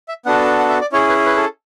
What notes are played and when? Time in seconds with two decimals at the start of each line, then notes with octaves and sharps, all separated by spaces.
0.08 E5
0.26 B3 D4 F#4 A4 F#5
0.59 F#5
0.69 E5
0.81 D5
0.92 C#4 E4 G#4 C#5
1.09 B4
1.26 B4
1.37 A4